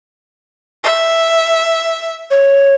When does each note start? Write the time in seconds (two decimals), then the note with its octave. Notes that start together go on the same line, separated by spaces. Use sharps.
0.83 E5
2.31 C#5